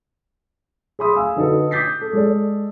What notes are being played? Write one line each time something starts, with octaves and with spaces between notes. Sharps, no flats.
G#4 E5 B5 C6 D#6
F5 G#5 E6
D3 D#4 F#4 A4 B4
D6 D#6 G6 A6 B6 C7
A4
G#3 A4 D5